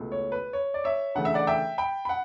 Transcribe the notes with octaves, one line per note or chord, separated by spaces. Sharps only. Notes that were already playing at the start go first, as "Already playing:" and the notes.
Already playing: C#2 B2 A3
C#5
B4
C#5
D5
C#5 E5
D2 C#3 E3 A3 F#5
E5
D5 F#5
E5 G5
G5 B5
B5
F#5